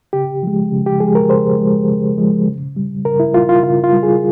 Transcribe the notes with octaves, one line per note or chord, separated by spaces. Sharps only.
C#3 G4
F3 G#3
C#3
G4
F3 G#3 G#4
A#4
C#3 C5
F3 G#3
C#3
F3 G#3
C#3
G3
C#3 A#4
E4
G3 F4
F4
C#3 F4
F4
G3
G#4